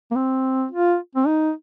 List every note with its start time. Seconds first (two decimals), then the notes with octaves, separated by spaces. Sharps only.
0.11 A#3
0.16 C4
0.71 F4
1.15 C4
1.27 D#4